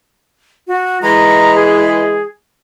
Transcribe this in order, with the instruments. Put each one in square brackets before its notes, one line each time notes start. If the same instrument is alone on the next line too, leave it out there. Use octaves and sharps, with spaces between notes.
[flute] F#4
[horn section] E3 G#3 [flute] A#5
[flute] G#4